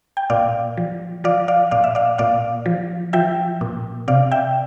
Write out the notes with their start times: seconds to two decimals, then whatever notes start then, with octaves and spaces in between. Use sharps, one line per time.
0.17 G5
0.30 A#2 D5 F5
0.77 F3
1.24 F3 D5 F5
1.48 D5 F5
1.71 A#2 D5 F5
1.84 E5
1.95 D5 F5
2.18 A#2 D5 F5
2.66 F3
3.13 F3 E5 G5
3.61 A#2
4.08 C3 D5 F5
4.31 E5 G5